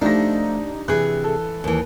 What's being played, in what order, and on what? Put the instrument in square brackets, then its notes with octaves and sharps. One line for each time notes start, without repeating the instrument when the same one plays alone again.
[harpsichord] F3 A3 [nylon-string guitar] D4 [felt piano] D#4 G4 A#6
[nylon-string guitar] C3 G#4 [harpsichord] E3 [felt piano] F#6
[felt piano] A4
[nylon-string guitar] D#2 E3